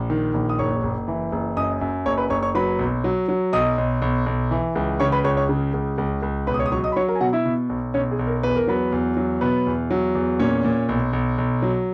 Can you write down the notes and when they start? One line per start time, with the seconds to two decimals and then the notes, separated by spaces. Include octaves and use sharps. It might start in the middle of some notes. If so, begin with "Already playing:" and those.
Already playing: A#1
0.10 D#3
0.34 A#1
0.49 D#6
0.59 F#1 C#5 C#6
0.83 F#1
1.08 E3
1.32 F#1
1.56 F#2 D#5 D#6
1.81 F#2
2.06 F#1 C#5 C#6
2.18 B4 B5
2.30 F#1 C#5 C#6
2.43 C#5 C#6
2.55 F#3 B4 B5
2.79 B1
3.04 F#3
3.29 F#3
3.53 B1 D#5 D#6
3.78 B1
4.02 B1
4.26 B1
4.51 E3
4.75 C#2
5.00 C#3 C#5 C#6
5.12 B4 B5
5.24 C#2 C#5 C#6
5.37 C#5 C#6
5.49 C#3
5.74 C#2
5.98 C#2
6.22 C#2
6.47 B1 B4 B5
6.54 D#6
6.59 C#5 C#6
6.66 D#6
6.72 F#3 C#5 C#6
6.84 D#5 D#6
6.92 B5
6.96 F#3 C#5 C#6
7.08 A#4 A#5
7.15 G#5
7.21 B2 F#4 F#5
7.33 E4 E5
7.45 B2
7.69 B1
7.94 B1 C#4 C#5
8.11 G#4
8.19 B1
8.27 A#4
8.43 E2 B4
8.56 A#4
8.67 F#3 B3 B4
8.92 E2
9.17 F#3
9.41 B2 B3 B4
9.67 E2
9.91 F#3
10.15 E2
10.39 A#2 C#4 C#5
10.65 A#2
10.89 B1
11.13 B1
11.38 B1
11.62 F#3